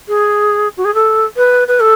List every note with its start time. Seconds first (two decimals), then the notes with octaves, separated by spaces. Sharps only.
0.08 G#4
0.77 F#4
0.85 G#4
0.95 A4
1.37 B4
1.68 B4
1.80 A4